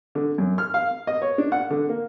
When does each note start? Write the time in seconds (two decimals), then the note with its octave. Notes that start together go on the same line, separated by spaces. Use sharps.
0.15 D3
0.38 F#2
0.58 F6
0.74 F5
1.07 D#5
1.22 C#5
1.38 D4
1.52 F#5
1.70 D3
1.89 A#3